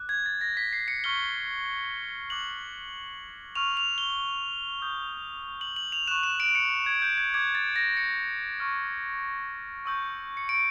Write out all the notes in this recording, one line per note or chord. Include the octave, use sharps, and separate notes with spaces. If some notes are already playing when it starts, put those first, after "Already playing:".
Already playing: D6 F#6
G#6
A6
A#6
B6
C7
C#7
C#6 F6 G7
D6 F#6 F#7
C#6 F6 F7
F7
G7
D#6 G6
F#7
F#7
F7
C#6 F#6 E7
E7
D7
C#7
G#6
G6
G#6
D6 F#6 G#6
A6
A#6
C#7
C#6 F6
C#6 E6 G6
C#7
D7